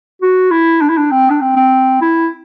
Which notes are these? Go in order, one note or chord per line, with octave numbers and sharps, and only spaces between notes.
F#4
E4
D4
E4
D4
C4
D4
C4
C4
E4